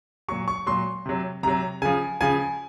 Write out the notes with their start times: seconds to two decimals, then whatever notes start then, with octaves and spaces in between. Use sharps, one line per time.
0.28 A#2 F#3 C#6
0.48 C#6
0.66 A#2 F#3 C6
1.06 C3 F#3
1.43 C3 F#3 A#5
1.82 C#3 F3 G#5
2.21 C#3 F3 G#5